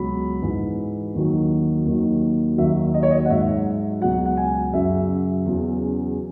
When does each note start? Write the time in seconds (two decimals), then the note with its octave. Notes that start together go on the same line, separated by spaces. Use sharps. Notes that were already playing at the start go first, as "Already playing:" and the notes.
Already playing: C#2 B2 F#3 B5
0.42 G#2 E3
1.14 D#2 D#3 F#3
1.86 D#2 D#3 F#3
2.57 D#2 D#3 F#3 E5
2.94 D#5
3.03 C#5
3.11 D#5
3.25 F#5
3.30 G#2 F#3 E5
4.01 C#2 B2 F#3 F#5
4.26 F#5
4.37 G#5
4.73 F#2 C#3 F#3 E5
5.46 E2 C#3 F#3